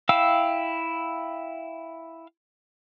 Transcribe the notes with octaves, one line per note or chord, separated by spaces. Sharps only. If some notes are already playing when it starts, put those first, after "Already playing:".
E4 F5 G5 E6